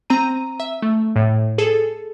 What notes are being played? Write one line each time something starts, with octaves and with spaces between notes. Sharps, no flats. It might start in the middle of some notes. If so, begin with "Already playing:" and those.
C4 A#5 D#7
E5
A3
A2
G#4 A4